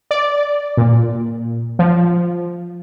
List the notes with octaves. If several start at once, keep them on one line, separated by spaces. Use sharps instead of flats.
D5
A#2
F3